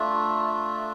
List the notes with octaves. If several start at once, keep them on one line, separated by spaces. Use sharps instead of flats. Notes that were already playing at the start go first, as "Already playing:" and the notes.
Already playing: A3 D4 F4 E5
E5